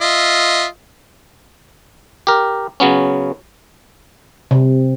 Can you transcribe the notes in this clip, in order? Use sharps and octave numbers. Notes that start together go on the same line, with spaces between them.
F4 D#5 E5
G4 A#4
C#3 F#3 B3 C#4
C3